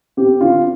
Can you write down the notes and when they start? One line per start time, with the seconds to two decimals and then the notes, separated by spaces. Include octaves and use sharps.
0.17 C4 G4
0.41 D3 F4